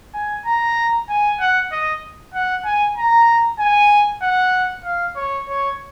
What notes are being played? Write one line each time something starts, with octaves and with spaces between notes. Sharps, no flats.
G#5
A#5
G#5
F#5
D#5
F#5
G#5
A#5
G#5
F#5
F5
C#5
C#5